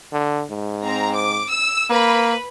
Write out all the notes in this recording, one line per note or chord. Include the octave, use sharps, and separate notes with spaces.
D3
G#2
C4 A#5
D6
E6
A#3 B4 B5